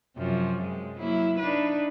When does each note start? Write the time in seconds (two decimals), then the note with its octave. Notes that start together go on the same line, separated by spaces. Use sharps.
0.17 F#2 C3 F3
0.62 G#3
0.97 F#3 A#3 E4
1.39 D4 D#4 B4